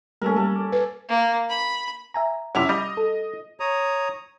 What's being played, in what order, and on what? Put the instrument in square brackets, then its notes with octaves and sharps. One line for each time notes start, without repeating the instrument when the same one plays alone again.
[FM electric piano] G3 A3 A#3 [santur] C#4 A4 A#4
[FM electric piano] G3 A#3 [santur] A4
[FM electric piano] D6
[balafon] B4
[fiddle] A#3
B5
[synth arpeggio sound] E5 G#5 A#5
[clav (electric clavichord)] F#2 C3 [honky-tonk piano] C#4 E4 F7
[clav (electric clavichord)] G3 [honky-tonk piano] D#5
[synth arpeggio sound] A4
[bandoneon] C#5 A#5 D#6